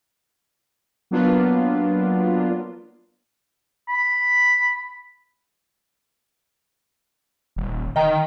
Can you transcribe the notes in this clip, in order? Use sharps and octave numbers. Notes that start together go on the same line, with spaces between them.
F#3 A#3 B3 D4 F4 B4
B5
D#1
D#3 D#5 G5 A#5